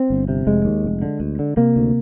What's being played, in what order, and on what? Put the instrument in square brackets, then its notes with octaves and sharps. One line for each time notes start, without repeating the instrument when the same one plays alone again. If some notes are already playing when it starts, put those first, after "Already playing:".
Already playing: [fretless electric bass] C4
G1
C3
F1 G#3
D#2
F1
D3
D2
D3
C3 A#3
D2